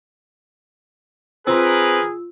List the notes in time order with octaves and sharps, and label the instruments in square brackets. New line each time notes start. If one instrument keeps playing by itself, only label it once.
[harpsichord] C4 [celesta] F4 E6 [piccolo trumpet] G#4 [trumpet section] A#4 B4